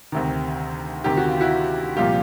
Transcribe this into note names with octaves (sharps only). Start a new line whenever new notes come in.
D2 C3 D#3
D2 C3 D#3 G4
F#4
F4
E4 F#4
C2 A#2 F3 F4 G4